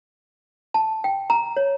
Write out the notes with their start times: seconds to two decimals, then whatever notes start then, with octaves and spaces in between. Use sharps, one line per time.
0.74 A5
1.04 G5
1.30 A#5
1.57 C#5